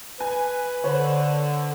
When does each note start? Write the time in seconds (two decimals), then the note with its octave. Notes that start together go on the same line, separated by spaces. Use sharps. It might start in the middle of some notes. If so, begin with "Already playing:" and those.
0.20 B4 G#5
0.84 D3 C5 C#5